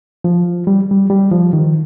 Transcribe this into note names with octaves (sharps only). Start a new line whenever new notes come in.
F3
G3
G3
G3
F3
D#3